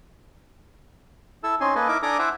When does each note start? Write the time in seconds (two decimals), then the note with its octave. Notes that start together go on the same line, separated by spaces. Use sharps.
1.43 E4 A4 E6
1.61 C4 C#4 D#4 G#5 C6
1.75 A#3 A4 B4 D#5 G#5
1.88 D#4 E4 A#4 D6
2.03 D4 A4 G#5 A#5 D6 D#6
2.19 E4 C5 E5 F#5 G#5 D6